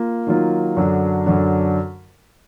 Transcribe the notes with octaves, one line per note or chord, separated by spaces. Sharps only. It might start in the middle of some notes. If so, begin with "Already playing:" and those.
Already playing: A#3 F4
D#3 F#3 A#3 F4
F#2 D3 F#3 D4
F#2 D3 F#3 D4